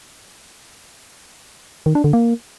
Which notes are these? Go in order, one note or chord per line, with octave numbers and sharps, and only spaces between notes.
D#3
D4
D3
A#3